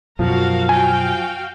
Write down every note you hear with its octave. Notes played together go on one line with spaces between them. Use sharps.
F#2 B2 F3 F#3 F#4 A#4 F5
F#4 F5 G5 G#5